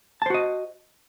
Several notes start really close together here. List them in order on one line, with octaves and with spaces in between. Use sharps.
A5 C5 F#4 D#5